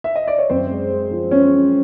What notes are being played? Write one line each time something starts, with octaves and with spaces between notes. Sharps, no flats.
E5
D#5
D5
C#5
F#2 C4 C5
G#3
G#3
F3
G#3 C#4 C#5